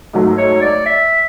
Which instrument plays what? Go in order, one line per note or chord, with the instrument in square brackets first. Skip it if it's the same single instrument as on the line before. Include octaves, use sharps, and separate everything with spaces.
[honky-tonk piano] G#2 F#3 A3
[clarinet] C#5
D5
E5